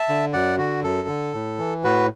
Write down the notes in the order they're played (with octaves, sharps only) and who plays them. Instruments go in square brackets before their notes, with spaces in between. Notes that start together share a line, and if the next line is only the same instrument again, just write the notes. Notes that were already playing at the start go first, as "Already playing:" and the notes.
Already playing: [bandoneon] E5 A5
D3
F#2 D5 F#5
D3 F#4
F#2 A4
D3
A2
E3
A2 F#4 B4